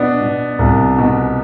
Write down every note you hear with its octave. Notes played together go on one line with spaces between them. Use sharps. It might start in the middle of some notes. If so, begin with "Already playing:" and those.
Already playing: B2 B3 D4
B2
C2
B2